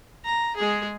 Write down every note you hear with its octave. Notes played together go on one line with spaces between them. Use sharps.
A#5
G#3 G#4